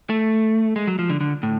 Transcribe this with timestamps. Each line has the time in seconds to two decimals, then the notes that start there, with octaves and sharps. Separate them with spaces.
0.10 A3
0.76 G#3
0.87 F#3
0.99 F3
1.10 D3
1.21 D3
1.43 A2